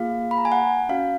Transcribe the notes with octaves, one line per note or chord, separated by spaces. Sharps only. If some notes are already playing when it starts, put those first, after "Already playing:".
Already playing: A#3 F4 G#4 F5
B5
A#5
G#5
F#5
C#4 F#4 F5